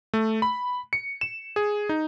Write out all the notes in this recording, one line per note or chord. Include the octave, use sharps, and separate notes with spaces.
A3
B5
C#7
E7
G#4
D#4